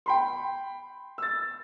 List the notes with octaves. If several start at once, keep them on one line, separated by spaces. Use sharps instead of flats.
G5 B5 C6
E6 A6